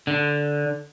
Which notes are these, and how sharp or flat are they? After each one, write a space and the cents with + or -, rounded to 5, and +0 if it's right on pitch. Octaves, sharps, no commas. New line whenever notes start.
D3 -5